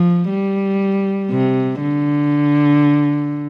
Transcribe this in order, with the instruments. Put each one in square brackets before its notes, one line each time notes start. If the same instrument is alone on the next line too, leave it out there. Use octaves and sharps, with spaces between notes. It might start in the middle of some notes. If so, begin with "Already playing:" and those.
Already playing: [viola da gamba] F3
G3
C3
D3